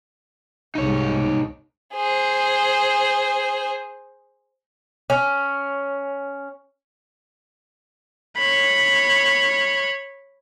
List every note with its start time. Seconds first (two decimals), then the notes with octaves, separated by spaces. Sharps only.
0.75 C2 G#2 D#4 C#5
1.94 G#4 C5
5.10 C#4
8.37 C#5 B5